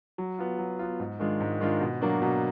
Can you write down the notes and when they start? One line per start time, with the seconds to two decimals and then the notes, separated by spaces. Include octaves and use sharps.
0.18 F#3
0.39 B3 F4
0.59 F#3
0.79 B3 F4
1.00 G#2
1.20 D#3 G#3 D4 F4
1.40 G#2
1.60 D#3 G#3 D4 F4
1.81 B2
2.01 F#3 A#3 D4 F#4
2.22 B2